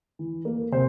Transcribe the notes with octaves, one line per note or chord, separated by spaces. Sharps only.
E3
A#3
C3 C5